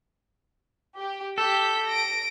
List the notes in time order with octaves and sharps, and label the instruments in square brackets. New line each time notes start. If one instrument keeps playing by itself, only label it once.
[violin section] G4
[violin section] G4 G6 B6 [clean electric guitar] A4
[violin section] A#6 D7